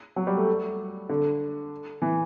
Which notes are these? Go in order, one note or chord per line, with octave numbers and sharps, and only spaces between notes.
F#3
G3
A3
D3
E3